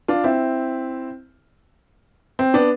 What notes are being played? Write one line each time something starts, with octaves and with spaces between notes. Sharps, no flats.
D4 F4
C4 E4
C4
B3 D4